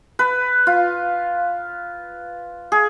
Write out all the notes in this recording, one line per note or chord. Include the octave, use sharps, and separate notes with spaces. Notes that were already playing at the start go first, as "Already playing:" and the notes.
B4
F4
G#4